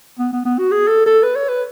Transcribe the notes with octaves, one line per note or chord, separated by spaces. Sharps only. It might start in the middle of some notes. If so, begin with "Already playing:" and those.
B3
B3
B3
F#4
G#4
A4
A4
B4
C#5
B4